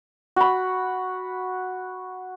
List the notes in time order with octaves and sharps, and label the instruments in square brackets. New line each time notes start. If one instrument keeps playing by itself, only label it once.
[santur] F#4 B5